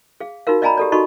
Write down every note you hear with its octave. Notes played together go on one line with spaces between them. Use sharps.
G#4 F5
D#4 F4 F#4 A#4 F5
D5 D#5 F5 G#5 A#5 B5
G4 A4 D5
D#4 F#4 A4 D#5 B5 C#6